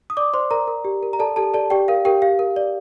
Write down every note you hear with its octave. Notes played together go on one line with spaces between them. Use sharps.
D#6
D5 D6
C5 D5 C6
A#4 D5 A#5
A#4
G4
A#4
A#5
A4 D5 A5
G4 A4 A5
A4 D5 A5
G4 D5 G5
A#4 F5
G4 A#4 G5
G4 F5
A#4
D5